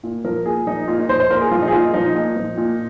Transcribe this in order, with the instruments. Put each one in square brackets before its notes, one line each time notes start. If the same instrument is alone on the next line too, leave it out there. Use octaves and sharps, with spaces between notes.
[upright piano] A#2
F3 A#4
A#2 G#4
F3 D#4
A#2 F4
D#4
F3 C5
C5
A#2 A#4
G#4
F3 F4
D#4
G#4
A#2 F4
F3 D#4
A#2
F3
A#2